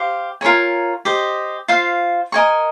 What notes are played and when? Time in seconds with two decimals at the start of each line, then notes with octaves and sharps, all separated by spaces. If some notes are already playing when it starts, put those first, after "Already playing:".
Already playing: G4 C5 F5
0.41 F4 A#4 C#5 G#5
1.05 G4 C5 D#5
1.68 F4 C5 F5
2.32 A#4 D#5 G#5 C#6